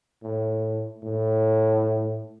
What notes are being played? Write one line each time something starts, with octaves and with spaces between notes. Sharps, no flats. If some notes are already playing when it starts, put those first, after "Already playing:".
A2
A2